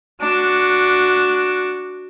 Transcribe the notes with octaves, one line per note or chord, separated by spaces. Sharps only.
D4 F#4